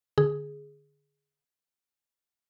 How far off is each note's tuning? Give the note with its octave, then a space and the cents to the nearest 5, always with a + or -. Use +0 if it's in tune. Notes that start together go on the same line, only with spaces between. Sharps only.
D3 +0 G#4 +0